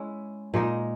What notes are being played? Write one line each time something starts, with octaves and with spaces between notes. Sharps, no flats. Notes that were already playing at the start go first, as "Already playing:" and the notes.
Already playing: G#3 C#4 E4
A#2 G#3 D#4